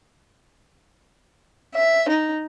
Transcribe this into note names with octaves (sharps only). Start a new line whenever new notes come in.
E5
D#4